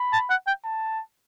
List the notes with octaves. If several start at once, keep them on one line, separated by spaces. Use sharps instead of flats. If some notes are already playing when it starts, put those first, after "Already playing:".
Already playing: B5
A5
F#5
G5
A5